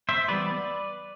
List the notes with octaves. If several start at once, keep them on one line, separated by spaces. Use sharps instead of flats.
C5 E5
E3 G3 B3 B4 D5